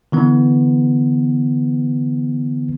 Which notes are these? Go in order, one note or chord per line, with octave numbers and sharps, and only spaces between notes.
D3 E3 B3